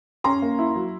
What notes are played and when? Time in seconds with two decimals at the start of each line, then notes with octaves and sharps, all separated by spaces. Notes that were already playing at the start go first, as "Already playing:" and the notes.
0.24 C#4 A#5 C6
0.42 A#3
0.59 E4
0.76 F#3